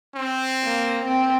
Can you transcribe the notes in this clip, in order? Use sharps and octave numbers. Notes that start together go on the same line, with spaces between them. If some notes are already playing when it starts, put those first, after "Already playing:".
C4
A#3
C4